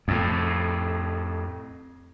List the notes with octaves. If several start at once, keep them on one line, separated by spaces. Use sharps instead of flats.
F2 A2